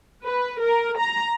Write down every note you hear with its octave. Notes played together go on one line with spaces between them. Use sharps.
B4
A#4
A#5